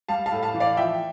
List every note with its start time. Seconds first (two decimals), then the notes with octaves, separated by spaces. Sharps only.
0.08 G3 F5 A5
0.26 F5 A5
0.32 A2
0.43 F5 A5
0.54 E3
0.60 D5 F5
0.77 F3 E5 G5